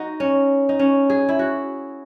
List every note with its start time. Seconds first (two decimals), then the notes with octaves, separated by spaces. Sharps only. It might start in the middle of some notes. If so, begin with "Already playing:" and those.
Already playing: D#4 F#4
0.20 C#4
0.69 D#4
0.79 C#4
1.10 G#4
1.29 E4
1.39 F#4